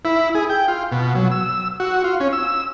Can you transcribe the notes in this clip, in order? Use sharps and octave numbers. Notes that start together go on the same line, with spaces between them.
E4
G#4
G5
F4
B2
F#3
E6
F#4
F4
C#4
E6